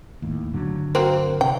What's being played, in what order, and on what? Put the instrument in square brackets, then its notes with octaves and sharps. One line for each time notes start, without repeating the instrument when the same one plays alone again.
[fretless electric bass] D#2 A2
G1 D3 F#3
[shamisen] A#3 C4 F#4
[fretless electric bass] C3 [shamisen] G5